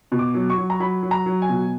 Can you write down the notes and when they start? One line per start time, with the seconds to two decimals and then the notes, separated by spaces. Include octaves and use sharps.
0.12 B2
0.19 D6
0.34 F#3
0.50 C#6
0.58 F#3
0.70 A#5
0.80 F#3 B5
1.03 F#3
1.11 A#5
1.26 F#3
1.42 G#5
1.49 B2